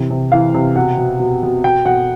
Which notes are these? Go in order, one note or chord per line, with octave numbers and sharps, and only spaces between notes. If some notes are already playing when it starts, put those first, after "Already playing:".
Already playing: C3 E3
C3
E3 F5
C3
B2 F#5
B2
B2
B2
B2 G5
B2 F#5